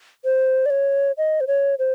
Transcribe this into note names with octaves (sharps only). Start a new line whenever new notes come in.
C5
D5
C#5
D#5
C5
C#5
C5